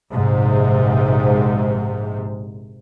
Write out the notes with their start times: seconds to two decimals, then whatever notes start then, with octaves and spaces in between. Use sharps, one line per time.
0.13 A#1 G#2 C3